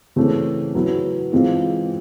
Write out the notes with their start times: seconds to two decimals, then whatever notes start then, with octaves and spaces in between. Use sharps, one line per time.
0.16 C#3 E3 A3 C4
0.75 F#3 B3 E4
1.32 E3 G#3 C4 F4